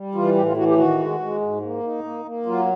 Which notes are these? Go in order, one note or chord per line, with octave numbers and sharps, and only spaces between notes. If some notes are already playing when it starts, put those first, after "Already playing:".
Already playing: G3
E3 F4
A2 G4
F4
E3 F#4
G4
D#3 F#4
G#3
G#3
G#2
A#3
D#4
A#3
A#3
F#3 F4